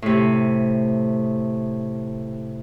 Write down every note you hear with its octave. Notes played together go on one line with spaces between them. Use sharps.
A2 C3